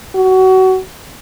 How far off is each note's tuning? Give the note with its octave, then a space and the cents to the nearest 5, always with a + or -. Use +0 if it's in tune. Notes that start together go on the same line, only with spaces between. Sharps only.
F#4 +25